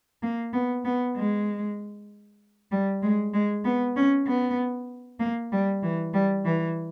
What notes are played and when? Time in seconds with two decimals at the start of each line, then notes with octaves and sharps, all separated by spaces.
0.22 A#3
0.53 B3
0.85 B3
1.16 G#3
2.71 G3
3.02 G#3
3.33 G#3
3.64 B3
3.96 C#4
4.27 B3
5.20 A#3
5.52 G3
5.83 E3
6.14 G3
6.44 E3